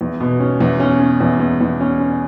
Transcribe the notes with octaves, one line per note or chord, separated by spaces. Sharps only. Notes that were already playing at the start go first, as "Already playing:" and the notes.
E2
B2
C#4
E2
C#4
C#4
E2
E2
E2
C#4
C#4